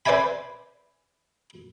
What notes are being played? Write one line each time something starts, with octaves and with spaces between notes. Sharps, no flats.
B4 C5 D5 E5 G#5 B5